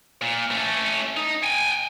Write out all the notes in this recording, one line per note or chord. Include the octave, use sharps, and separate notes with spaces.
A#2
A3 C#4
D#4
G5 G#5